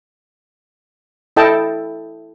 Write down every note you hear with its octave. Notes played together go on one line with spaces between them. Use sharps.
E4 A4 D#5 G5 A5